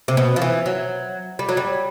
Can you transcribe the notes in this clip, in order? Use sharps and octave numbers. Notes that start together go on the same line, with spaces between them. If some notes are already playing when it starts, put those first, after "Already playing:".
C3
B2
F3
E3
F#3
G3
F#3
G3